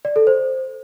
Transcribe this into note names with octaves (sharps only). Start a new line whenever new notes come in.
D5
A4
C5